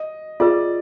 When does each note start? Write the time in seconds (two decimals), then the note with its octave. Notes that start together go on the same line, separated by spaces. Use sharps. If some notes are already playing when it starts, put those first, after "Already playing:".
Already playing: D#5
0.40 F4 G#4 B4 D5